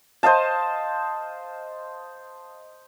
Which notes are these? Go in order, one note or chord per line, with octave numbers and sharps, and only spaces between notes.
C5 D#5 F5 A5